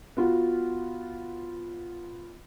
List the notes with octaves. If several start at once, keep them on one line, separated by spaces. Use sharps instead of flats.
B3 F4 F#4